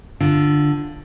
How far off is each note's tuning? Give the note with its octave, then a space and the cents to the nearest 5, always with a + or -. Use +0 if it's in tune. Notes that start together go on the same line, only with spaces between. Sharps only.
D3 +5 F4 -10